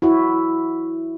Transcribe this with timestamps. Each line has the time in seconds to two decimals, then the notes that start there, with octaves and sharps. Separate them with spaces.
0.02 E4 F#4